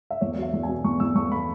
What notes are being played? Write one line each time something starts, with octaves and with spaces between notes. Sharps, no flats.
E5
E2 C#5
F#3 E5
E2
G#5
B2
E2 C#6
E2 E6
E2 C#6
B5